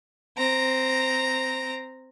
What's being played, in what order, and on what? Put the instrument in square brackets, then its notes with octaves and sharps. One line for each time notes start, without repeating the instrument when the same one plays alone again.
[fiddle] C4 A#5